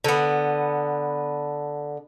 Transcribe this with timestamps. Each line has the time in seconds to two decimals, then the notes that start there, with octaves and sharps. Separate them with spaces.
0.04 D3 B3